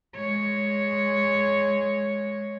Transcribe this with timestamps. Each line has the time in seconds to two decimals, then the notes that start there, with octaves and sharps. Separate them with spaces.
0.16 G#3 C#5